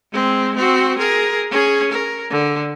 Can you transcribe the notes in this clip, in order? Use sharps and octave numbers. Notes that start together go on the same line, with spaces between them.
G#3 C4
C4 F#4
G#4 A#4
C#4 G#4
A#4
D3